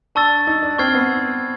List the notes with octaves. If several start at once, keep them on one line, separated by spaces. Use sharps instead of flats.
D4 A5 C#6 E6 A6
D#4
D4
C4 C#6 F6 G#6 C7
B3